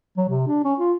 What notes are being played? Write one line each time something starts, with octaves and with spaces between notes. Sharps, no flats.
F#3
C3
D4
C#4
F4